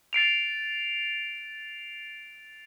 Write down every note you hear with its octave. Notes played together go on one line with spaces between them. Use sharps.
A6 C7 D7 F7